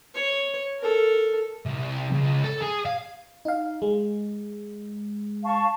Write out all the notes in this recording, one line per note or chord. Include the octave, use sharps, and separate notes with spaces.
C#5
A4 A#4
C2
C#2
A4
G#4
F5
D#4 F5
G#3
F5 A5 C#6